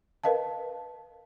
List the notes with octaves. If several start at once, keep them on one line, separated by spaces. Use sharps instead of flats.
A#4 B4 D#5 F5 A5